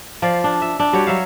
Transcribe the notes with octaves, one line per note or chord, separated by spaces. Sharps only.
F3 F4 D5
D4
E5
D4
G3 F#4 G4 C#5
F#3 E5 F5